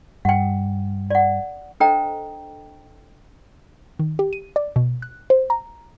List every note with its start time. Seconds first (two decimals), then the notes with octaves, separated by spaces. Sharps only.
0.25 G2 F#5 G5
1.10 D5 F#5
1.80 D4 A4 C5 D#5 G5 A#5
3.99 D#3
4.19 G4
4.33 D#7
4.56 D5
4.76 B2
5.02 F#6
5.30 C5
5.50 A#5